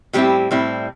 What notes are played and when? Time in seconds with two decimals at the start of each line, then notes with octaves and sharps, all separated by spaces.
0.13 A2 G3 C4 E4 G4
0.51 A2 G3 C4 E4